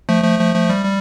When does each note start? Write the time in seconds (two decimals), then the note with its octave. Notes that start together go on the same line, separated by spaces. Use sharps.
0.09 F3 A3
0.24 F3 A3
0.39 F3 A3
0.54 F3 A3
0.70 G3
0.85 G3